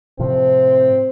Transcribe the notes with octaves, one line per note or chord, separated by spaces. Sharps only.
A2 C3 F3 C4